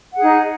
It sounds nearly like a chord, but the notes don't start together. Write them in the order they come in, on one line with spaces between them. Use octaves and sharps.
F#5 G#4 D#4